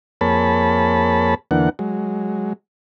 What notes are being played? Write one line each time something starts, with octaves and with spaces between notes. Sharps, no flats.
F2 A#3 G#4 C#5 A5 B5
E2 D3 E3 A#3 D4 F#5
F#3 G#3